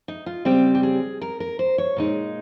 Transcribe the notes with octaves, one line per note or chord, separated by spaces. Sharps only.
D#4
F4
C#3 G3 C4 G4
G4
G#4
A#4
A#4
C5
C#5
A#2 G#3 D#4